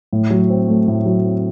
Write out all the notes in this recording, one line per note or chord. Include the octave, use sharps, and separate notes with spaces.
A2
F#3
C4
A3
A2
F#3
C4